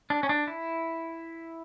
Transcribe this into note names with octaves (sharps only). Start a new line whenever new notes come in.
D4
C#4
D4
E4